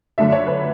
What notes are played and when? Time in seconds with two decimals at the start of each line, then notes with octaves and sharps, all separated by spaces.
0.18 F#2 D3 A3 E5
0.32 C#5
0.47 B4